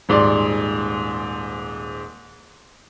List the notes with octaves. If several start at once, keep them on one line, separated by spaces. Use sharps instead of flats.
D#1 G#2 D5 C6